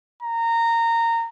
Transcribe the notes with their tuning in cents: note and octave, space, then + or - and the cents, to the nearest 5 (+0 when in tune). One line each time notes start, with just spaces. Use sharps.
A#5 -20